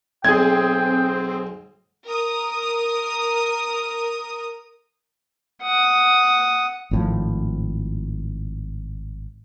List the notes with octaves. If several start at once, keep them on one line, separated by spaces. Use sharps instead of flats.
B1 C4 G#4 G5 G#6
A#4 D#6
F#5 D#6
G#1 A2 F3